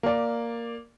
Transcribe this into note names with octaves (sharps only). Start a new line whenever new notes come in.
A#3 D5